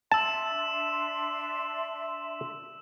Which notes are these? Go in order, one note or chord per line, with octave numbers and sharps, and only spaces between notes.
D4 E5 A5 C6 E6 E7